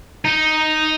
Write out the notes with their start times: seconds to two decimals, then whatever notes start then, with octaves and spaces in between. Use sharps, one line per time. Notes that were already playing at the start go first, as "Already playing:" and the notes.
0.25 D#4